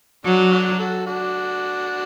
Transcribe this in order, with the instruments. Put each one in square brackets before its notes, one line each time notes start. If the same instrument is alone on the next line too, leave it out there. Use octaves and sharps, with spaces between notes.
[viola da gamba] F#3 [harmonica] D4 F#4
[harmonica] D4 F#4
F#4 A4
D4 F#4